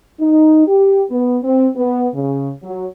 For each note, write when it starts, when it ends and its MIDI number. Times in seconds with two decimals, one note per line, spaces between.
0.20 0.65 63
0.67 1.03 67
1.10 1.37 59
1.43 1.68 60
1.76 2.08 59
2.15 2.50 49
2.63 2.86 54